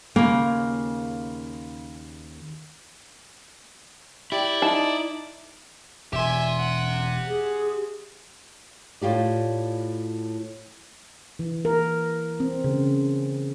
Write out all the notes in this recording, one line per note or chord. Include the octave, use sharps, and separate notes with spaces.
D#2 C#3 A#3
E4 G4 D5
D#4 A5
E1 G4 E5 G#5 C6
F#5
G#4
A2 F4 G4 D5
E3
A#4
C4
C#3